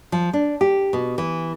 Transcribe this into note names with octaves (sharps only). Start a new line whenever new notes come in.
F3
D4
G4
B2
E3